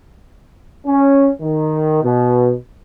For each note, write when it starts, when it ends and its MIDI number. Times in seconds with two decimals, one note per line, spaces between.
0.86 1.28 61
1.40 2.00 51
2.03 2.53 47